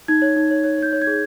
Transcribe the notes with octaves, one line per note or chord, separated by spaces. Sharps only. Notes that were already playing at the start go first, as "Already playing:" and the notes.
D#4 G#6
C#5
D#4
C#5
C#5
C#5 G6
C#5
G#6
G#4